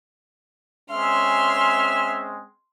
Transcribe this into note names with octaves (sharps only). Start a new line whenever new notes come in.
G#3 C4 C#4 E5 C6 F6